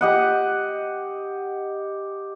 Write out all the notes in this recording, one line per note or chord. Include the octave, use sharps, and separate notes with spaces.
G4 D#5 F#5